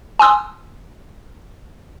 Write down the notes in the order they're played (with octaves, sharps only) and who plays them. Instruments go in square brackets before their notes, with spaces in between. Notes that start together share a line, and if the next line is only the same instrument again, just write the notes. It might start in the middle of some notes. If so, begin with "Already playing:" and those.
[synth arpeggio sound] G#5 C6 D#6 E6